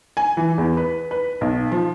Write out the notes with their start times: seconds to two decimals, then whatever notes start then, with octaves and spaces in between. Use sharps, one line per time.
0.17 G#5
0.37 E3
0.58 E2
0.77 B4
1.11 B4
1.41 B1
1.72 F3